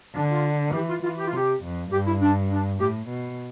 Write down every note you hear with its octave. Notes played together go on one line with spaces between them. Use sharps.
D3 D4
F4
E3 G4
F4
E3 F4
G4
F4
C3 G4
F2
G2 G4
E4
D4
D4
A2 G4
B2